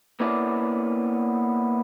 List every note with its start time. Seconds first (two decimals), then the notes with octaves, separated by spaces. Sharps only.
0.20 A#3 B3 C#4 E4 D5